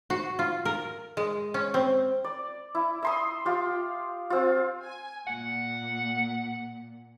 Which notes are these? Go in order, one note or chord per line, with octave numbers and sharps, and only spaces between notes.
F#4
F4
A#4
G#3
C#4
C4
D5
E4
E5 C6 D#6
F4 G4
C4 F4
G#5
A#2 F#5